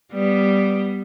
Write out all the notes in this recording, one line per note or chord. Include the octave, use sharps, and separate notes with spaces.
G3 B3